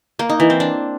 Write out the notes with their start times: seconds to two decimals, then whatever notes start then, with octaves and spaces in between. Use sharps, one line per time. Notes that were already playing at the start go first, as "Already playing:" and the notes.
0.19 A#3
0.29 D#4
0.40 E3
0.50 C4
0.60 D4